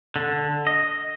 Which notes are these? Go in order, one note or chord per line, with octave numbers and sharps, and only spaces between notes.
D3
D#5